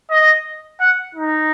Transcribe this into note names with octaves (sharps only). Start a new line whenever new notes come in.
D#5
F#5
D#4